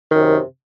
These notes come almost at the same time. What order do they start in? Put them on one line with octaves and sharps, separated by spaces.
D#3 F#2 C3